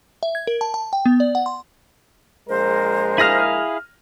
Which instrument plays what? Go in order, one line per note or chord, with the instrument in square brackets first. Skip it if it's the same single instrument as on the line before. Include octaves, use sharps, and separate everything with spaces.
[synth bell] E5
G#6
A#4
A5
A5
G5
B3
D5
F#5
C6
[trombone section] A#1 G#3 A#4 [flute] C5
[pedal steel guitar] E4 G#4 F5 [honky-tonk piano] F6 A#6 D#7